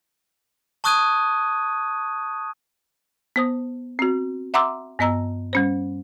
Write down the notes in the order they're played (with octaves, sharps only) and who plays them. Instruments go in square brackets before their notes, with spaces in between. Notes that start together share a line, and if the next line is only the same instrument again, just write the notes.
[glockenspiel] A5 C#6 D#6 F#6 G#6 D#7
[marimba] B3 C5 D#6
C4 F#4
E5 F#5 A#5 C6 D6 E6
G2 B3 D#5 A#5 E6
G3 C#4 C5